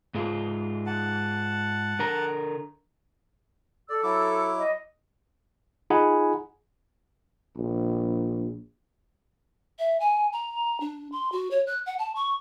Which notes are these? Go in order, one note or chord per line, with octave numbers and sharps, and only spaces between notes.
G#2 G#3 F4
F#5 A5
D3 A#4 A#5
A4 D5 E6
F#3 E4 D6
D#5
D#4 F4 G#4 F#5 G#5 B5
A#1
E5
G#5
A#5
D4
C6
F#4
C#5
F#6
F#5
A5
C#6